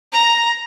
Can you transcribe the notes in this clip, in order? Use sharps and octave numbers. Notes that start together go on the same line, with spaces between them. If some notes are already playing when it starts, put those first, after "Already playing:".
A#5